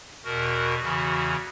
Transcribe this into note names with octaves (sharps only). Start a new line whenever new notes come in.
E2 B2 F#4 A#4
E2 C#3 E3 F#4